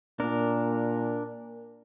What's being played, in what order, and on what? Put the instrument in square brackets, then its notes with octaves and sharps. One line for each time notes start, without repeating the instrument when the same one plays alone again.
[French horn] A#2 [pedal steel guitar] D4 A#4